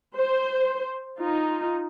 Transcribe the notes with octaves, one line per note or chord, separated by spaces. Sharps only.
C5
D#4 F4